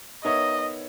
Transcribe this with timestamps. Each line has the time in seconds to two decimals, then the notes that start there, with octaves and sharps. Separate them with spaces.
0.24 B3 D#4 A#4 C#5 D#5 E5